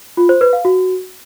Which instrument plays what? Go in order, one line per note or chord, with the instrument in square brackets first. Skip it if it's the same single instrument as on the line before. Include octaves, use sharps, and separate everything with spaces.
[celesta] F4
C5
B4
F5
F#4